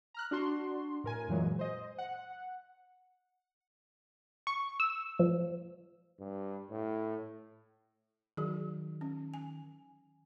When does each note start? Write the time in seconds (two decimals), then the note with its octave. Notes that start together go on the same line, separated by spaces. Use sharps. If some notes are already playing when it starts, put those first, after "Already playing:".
0.14 A#5 F6 F#6
0.31 D4 F#4 C6
1.04 A2 A#4 G#5
1.28 F#2 A#2 E3 F#3 G#3
1.59 C5 D#5
1.98 F#5
4.47 C#6
4.80 E6
5.19 F3
6.20 G2
6.71 A2
8.37 D#3 F#3 F#4 G#4
9.01 C#4
9.34 G#5